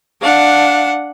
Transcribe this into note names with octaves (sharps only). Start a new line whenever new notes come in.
D4 F5 F#5